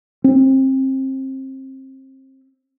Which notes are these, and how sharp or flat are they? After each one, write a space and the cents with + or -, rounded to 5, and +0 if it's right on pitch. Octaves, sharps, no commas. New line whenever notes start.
C4 +25